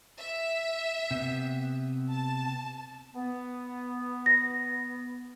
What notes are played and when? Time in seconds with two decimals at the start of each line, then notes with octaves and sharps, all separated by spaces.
0.19 E5
1.11 C3 B3
2.11 A5
3.15 B3
4.26 A#6